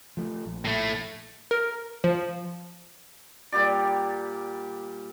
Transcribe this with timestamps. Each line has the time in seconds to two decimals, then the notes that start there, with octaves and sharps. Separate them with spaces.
0.17 F3 A3
0.46 A#1
0.65 A2 A3
1.51 A#4
2.04 F3
3.52 A#2 G3 G4 D5